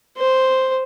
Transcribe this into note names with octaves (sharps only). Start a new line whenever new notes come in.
C5